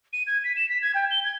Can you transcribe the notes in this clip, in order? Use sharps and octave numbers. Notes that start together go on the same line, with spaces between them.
D#7
G#6
B6
E7
B6
G#6
G5
G7
G#6